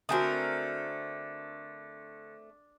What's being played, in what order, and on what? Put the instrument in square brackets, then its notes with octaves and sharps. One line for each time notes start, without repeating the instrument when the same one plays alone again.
[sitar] D3 [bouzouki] A3 C4 A#4 [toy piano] F#4 G#5 D#6